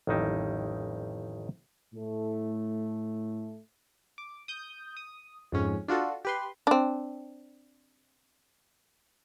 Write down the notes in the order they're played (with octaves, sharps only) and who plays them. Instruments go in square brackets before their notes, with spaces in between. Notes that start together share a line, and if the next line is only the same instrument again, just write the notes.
[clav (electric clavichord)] A1 F2 D#3 G3 D#4 E4
[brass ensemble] A2 A3
[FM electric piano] D6
D#6 G6
D#6
F2 G#2 C#4
D4 F4 F#4 A4
G4 B4 C6
[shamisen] C4 D4